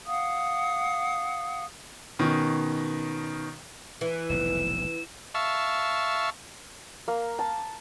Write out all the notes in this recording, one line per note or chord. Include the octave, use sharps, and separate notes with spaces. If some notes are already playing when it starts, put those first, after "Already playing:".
F5 F#5 D#6
B2 D#3 C#4
E3
F1 B1 A2 E7
E5 F5 A5 C#6
A#3
A5